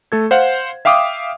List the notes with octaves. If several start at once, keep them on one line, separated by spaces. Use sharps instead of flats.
A3 A4 G#6
C5 F5 F#5
E5 F5 G5 D6 D#6